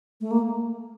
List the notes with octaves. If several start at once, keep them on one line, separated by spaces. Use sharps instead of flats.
A3
A#3